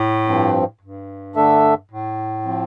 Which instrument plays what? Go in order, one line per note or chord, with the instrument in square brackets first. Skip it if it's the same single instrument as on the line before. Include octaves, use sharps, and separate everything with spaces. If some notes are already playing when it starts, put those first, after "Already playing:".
Already playing: [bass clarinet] A2
[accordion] G2 F3 C4
[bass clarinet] G2
[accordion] D3 A3 D4 A4 E5
[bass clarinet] A2
[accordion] F3 C4